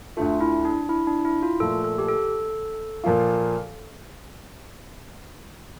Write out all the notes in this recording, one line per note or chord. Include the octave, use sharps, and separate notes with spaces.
D2 D3 A3 F4
E4
D4
E4
D4
E4
F4
A#2 F3 A3 A4
A4
G4
A4
A#2 F3 A#3 F4